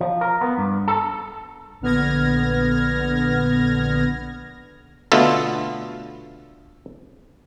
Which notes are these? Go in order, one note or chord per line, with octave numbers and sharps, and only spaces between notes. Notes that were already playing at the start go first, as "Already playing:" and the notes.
F3
A#4
B3
G2
A4
A#1 D3 B3 F6 G#6 A#6
B2 D3 A3 B3 F4 A4